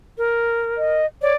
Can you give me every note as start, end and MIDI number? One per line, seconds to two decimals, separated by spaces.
0.18 1.01 70
0.77 1.06 75
1.22 1.33 73
1.22 1.36 74